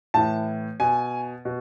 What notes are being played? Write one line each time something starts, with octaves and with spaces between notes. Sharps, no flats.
A2 E3 A5
B2 G#5
B2